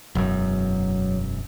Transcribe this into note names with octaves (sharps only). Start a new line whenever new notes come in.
E1 F#2 F#3